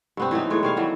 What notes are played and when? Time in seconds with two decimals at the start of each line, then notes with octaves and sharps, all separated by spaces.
0.17 G2 B3 C4
0.31 E3 F#3 B3 D#4
0.50 A2 G#3 C#5
0.63 G3 C#5 F5
0.77 D#3 E3 F#3